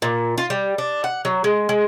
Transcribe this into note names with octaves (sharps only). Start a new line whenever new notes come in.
A#2
F4
G3
D4
F#5
F#3
G#3
G#3